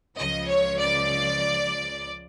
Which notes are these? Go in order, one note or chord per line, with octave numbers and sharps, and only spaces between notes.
C#2 C#3 F3 D#5
C#5
D5